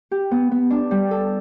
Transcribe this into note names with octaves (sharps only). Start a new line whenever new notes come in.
G4
B3
B3
D4
G3
A4